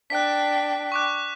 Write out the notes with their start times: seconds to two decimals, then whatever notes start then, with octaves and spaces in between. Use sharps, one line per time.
0.10 D4 G5 F#6 B6
0.92 C#6 D6 F#6